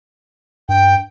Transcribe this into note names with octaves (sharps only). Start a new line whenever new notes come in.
G2 G5